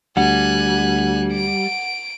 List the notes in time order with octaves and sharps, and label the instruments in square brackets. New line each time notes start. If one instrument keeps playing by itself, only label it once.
[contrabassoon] D2 [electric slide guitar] G3 [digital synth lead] F#5 [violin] G#5 F#6
[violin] D7